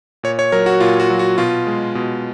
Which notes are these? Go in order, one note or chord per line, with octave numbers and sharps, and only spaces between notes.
A#2 C#5
C#5
F#3 A#4
F#4
A#2 F4
F#4
F#3
F#4
B2 F4
G#3
B2